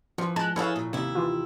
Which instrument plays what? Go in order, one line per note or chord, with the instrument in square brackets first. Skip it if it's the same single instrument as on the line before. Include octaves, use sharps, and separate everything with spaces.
[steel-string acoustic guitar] E3 [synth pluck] F3
[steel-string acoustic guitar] G#3 [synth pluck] A5 F#6
[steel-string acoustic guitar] E3 G#4 A4 [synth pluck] E4 C#5 F5
[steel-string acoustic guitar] A#2
[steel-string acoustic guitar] D#2 E4 [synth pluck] C3
[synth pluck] E3 F4